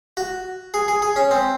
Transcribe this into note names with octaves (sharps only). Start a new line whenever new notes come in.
F#4
G#4
G#4
G#4
C#4
C4